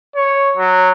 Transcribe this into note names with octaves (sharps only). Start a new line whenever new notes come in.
C#5
F#3